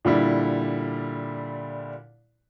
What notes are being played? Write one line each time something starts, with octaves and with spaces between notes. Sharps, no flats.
A#2 D3 G3 E4